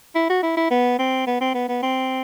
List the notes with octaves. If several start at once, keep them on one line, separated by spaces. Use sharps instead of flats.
E4
F#4
E4
E4
B3
C4
B3
C4
B3
B3
C4